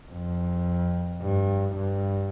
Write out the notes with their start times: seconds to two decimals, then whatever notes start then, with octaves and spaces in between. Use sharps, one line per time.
0.12 F2
1.22 G2
1.76 G2